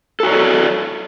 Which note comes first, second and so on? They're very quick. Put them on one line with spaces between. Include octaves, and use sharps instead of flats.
A4 F#4 C#5 D5